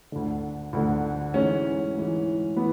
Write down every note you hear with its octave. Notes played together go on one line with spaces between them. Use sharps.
D2 D3
D2 D3
G#2 E3 C#4
G#2 E3
E3 B3